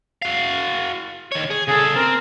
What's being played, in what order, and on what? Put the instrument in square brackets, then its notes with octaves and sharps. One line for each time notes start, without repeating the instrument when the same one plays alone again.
[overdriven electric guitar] F#4 F5
D#3 C#5
G#4
[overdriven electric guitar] C#3 A4 [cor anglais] G#4
[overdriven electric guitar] C4 [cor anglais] A#4